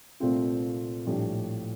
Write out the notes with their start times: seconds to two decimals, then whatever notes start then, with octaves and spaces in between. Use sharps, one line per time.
0.20 C2 A#2 A3 C4 F4
1.07 A#1 A2 G3